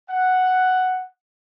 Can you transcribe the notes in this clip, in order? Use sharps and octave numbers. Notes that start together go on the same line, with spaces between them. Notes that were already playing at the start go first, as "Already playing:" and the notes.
F#5